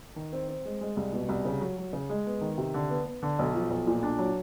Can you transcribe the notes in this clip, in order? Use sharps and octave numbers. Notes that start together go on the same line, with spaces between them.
D#3
C4
C4
G#3
G#3
C2
B2
C2
C#3
F#3
F#3
C#3
G#3
B3
D#3
C3
D3
B3
B3
D3
B1
F3
B1
A#2
D4
F#3